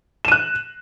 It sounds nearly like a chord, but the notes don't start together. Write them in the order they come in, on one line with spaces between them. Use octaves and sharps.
E7 D#7 F#6